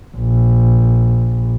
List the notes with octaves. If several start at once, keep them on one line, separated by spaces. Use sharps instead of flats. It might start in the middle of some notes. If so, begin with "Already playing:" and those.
A#1